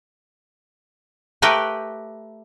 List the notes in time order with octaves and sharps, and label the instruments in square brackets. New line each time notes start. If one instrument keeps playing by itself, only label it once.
[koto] A3 G4 A#4 B4 F#5 G5